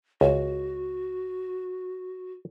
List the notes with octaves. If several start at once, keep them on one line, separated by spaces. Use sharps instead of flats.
C#2 F#4